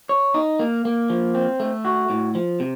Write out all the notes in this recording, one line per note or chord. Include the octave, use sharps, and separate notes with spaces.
C#5
D#4
A#3
A#3
F3
C4
A3
F#4
A2
F3
C3